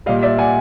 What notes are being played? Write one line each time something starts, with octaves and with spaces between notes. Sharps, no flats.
A#2 G3 D#5 F5
D5 E5
F#5 G#5